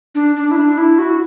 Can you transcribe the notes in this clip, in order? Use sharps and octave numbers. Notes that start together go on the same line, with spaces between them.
D4
D4
E4
D4
E4
F#4